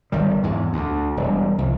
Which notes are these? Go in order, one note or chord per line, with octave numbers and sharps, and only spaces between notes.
G1 D#3 G3
E2 G#2
D2
E1 G3
C2 F3